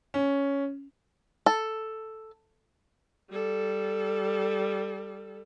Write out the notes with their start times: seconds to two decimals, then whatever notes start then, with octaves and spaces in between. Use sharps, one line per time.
0.14 C#4
1.46 A4
3.31 G3 A4